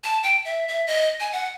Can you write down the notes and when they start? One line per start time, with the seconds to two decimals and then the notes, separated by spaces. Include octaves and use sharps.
0.04 A5
0.23 G5
0.45 E5
0.68 E5
0.87 D#5
1.20 G#5
1.32 F#5